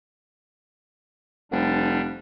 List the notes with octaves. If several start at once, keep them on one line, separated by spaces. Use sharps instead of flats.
F1 G3 D4